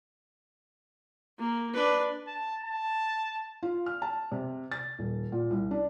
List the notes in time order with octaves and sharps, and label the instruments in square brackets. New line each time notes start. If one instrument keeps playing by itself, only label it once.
[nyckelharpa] A#3
D4 B4
[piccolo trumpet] A5
A5
[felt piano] F4
F6
A5
C3
A6
D#1
A#2
C2
D4